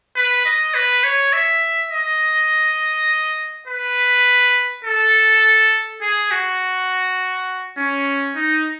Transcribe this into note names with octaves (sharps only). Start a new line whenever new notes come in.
B4
D#5
B4
C#5
E5
D#5
B4
A4
G#4
F#4
C#4
D#4